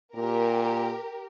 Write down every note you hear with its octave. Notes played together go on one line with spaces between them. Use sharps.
A#2 G4 A#4